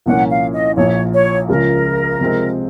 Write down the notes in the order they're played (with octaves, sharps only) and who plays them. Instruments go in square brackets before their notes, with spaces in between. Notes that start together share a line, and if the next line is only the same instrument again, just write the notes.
[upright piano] C2 A#2 F3 A#3 C#4 [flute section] F#5
[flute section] F5
D#5
[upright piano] A#1 A#2 F3 [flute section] C#5
[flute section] C#5
[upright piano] C#2 C#3 F3 [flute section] A#4
[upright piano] C3 F3 G#3 C4